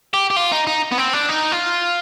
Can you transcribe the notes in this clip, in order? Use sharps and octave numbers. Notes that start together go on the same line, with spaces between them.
G4
G4
F4
D#4
D#4
B3
C4
D4
D#4
F4